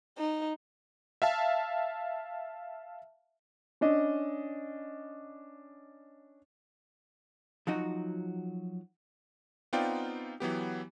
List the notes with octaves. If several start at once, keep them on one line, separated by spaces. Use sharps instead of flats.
D#4
E5 F5 A5
C#4 D4 D#5
F3 F#3 D#4 F#4
B3 C4 D#4 F4 D5 G5
E3 F#3 B3 G4